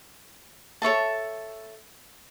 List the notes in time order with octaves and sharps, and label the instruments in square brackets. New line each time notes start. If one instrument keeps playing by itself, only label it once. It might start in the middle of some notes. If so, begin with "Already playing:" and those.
[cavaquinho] A4 C#5 E5 A5